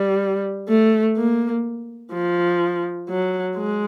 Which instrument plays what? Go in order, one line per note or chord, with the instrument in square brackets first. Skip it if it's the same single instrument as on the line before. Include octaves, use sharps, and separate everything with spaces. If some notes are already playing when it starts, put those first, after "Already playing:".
Already playing: [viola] G3
A3
A#3
F3
F#3
G#3